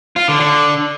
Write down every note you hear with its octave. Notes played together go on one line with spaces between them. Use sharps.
F4
D3
D3